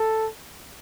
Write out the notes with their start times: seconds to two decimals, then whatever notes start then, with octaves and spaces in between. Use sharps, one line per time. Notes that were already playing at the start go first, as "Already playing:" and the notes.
Already playing: A4